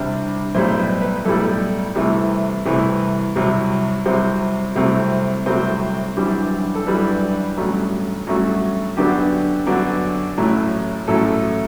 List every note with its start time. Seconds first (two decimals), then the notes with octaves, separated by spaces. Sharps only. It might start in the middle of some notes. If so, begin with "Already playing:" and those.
Already playing: C2 C3 G3 D4
0.55 B1 A2 G3 C5
0.78 B4
1.02 B4
1.25 B1 A2 G3 A4
1.95 C2 C3 E3 A3
2.65 C2 C3 E3 A3
3.36 C2 C3 F#3
4.05 C2 C3 F#3 C5
4.75 C2 C3 F#3 A3 C4
5.46 C2 C3 F#3 A3 C4 C5
6.17 F#2 E3 G3 D4
6.75 A4
6.86 F#2 E3 G3 D4 B4
7.57 A1 G2 F#3 A3
8.27 A1 G2 F#3 A3 F#4
8.97 F#2 D3 F#3 B3 D4 G4
9.67 F#2 D3 F#3 B3 D4
10.37 A1 A2 F#3 A3
11.08 A1 A2 F#3 A3 A4